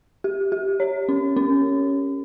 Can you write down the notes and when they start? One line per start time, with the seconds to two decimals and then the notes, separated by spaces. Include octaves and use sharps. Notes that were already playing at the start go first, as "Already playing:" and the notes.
0.24 G4
0.52 G4
0.80 C#5
1.09 C#4
1.36 C#4